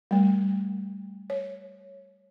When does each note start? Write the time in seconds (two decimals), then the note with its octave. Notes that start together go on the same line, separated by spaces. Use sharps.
0.11 G3 A3
1.30 C#5